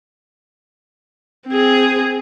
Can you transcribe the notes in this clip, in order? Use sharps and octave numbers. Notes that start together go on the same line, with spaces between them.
C4 G#4